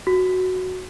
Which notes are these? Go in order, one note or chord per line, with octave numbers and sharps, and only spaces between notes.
F#4